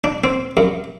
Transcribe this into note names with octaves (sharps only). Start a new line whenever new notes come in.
D4
C4
F#2